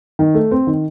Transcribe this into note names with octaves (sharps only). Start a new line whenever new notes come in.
D#3
A3
C4
D#3